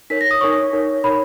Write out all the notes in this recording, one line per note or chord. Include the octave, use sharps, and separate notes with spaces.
D#4 A#4 C#5 B6
A#6
D#6
D#4 A#4 C#5 C#6
D#4 A#4 C#5
D#4 A#4 C#5 B5